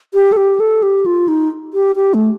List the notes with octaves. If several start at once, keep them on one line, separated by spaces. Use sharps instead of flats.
G4
A4
G4
A4
G4
F4
D#4
G4
G4
A3